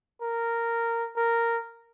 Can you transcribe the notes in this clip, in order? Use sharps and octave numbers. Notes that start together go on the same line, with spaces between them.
A#4
A#4